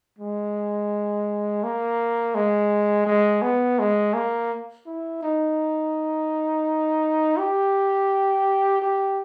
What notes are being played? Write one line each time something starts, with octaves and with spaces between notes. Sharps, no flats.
G#3
A#3
G#3
G#3
B3
G#3
A#3
E4
D#4
G4
G4